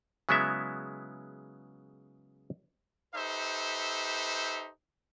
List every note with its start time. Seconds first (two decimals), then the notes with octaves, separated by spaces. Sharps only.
0.29 C#3 F#3 G#3 B3 E4 E5
3.15 D#4 G4 A4 B4 C5 E5